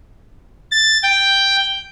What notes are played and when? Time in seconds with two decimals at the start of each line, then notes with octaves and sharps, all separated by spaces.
0.71 A6
1.03 G5